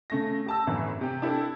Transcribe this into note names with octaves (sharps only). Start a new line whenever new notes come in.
C#3 A3 A#6
G4 A5 E6
G1 F#2 A2 E3
C3 G4
D4 E4 G4 A4